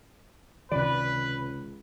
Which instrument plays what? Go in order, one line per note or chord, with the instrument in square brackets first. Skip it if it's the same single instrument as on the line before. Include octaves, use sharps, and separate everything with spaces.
[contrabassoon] C#2 [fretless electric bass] C3 D#3 [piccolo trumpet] B4 [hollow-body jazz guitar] D5